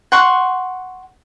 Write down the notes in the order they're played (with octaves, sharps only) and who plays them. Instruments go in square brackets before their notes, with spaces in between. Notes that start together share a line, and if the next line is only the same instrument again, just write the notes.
[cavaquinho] F#5 C6 C#6